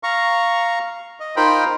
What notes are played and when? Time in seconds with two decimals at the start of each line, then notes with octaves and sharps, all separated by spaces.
0.03 F5 A#5 C#6
1.20 D#5
1.36 D#4 F4 A#4 C5 G5 B5